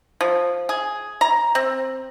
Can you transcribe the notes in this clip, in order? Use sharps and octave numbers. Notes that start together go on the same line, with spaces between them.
F3
G#4
A#5
C4